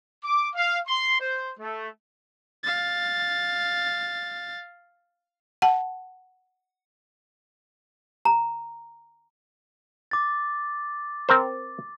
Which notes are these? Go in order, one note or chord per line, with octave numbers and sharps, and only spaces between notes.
D6
F5
C6
C5
A3
F5 A6
F#5 A5
A#5
D6 A6
C4 A#4 C5